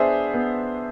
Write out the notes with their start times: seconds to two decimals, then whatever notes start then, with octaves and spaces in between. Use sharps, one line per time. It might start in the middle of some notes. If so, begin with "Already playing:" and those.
Already playing: B3 D4 G#4 C5 E5
0.34 B3